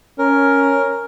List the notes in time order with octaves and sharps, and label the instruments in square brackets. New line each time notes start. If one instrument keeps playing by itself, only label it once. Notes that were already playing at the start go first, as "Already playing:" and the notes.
[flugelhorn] C#4 [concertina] A#4